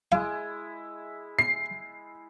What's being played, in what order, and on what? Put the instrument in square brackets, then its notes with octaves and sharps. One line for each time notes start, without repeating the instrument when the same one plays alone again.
[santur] G#3 E4 [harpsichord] F5
[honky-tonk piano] C7